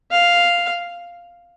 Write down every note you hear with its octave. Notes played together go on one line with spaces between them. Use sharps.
F5